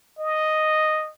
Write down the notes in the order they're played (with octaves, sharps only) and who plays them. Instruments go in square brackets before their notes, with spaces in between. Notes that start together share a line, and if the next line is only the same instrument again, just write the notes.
[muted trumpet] D#5